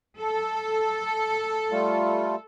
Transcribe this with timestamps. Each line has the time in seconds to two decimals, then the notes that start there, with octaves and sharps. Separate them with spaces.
0.19 A4
1.72 G3 A3 F4